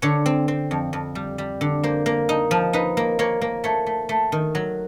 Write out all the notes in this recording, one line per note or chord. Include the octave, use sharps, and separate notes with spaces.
D3 C#5
C4
C4
F2
F2
G3
G3
D3
A#3 C5
A#3
D#4
F3
D#4 B4
A#3
A#3 C#5
A#3
A3 C#5
A3
A3
D#3
F#3